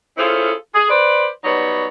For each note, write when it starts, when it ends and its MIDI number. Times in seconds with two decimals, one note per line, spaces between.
0.17 0.52 61
0.17 0.52 64
0.17 0.52 65
0.17 0.52 68
0.17 0.52 69
0.17 0.52 72
0.74 0.87 68
0.89 1.27 71
0.89 1.27 72
0.89 1.27 74
1.44 1.86 54
1.44 1.86 55
1.44 1.86 59
1.44 1.86 63
1.44 1.86 73